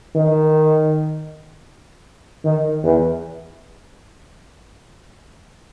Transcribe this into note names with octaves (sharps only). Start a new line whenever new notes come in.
D#3
D#3
E2